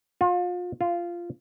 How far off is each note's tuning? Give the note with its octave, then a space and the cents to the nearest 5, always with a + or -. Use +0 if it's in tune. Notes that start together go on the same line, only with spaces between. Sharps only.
F4 +35
F4 -10